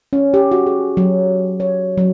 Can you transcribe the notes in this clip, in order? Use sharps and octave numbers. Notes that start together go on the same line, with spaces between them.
C#4
G4
F#4
G#4
F#3
C#5
F#3